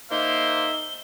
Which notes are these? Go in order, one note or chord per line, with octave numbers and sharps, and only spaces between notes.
A#3 D#4 C5 E5 G7